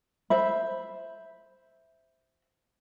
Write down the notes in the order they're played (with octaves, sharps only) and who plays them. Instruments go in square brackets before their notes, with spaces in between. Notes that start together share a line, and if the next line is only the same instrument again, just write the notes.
[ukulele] C5 E5 B5